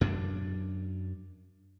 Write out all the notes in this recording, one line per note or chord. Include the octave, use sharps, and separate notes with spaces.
F#2 D4